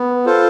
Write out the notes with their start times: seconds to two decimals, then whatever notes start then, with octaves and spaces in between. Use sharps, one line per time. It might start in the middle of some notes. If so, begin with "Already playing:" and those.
Already playing: B3
0.26 F4 A4 C5